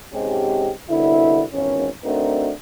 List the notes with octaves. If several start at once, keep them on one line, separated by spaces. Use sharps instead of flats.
G#2 C3 G#3 C#4 G4
C2 B2 D3 E4
G#1 E2 C#4
A3 C4 D4 D#4 F#4 A#4